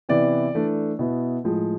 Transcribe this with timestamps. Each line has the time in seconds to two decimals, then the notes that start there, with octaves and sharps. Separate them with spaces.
0.09 C3 E3 B3 E4 D5
0.55 E3 A3 D4
0.99 B2 B3 E4
1.44 A2 F3 G#3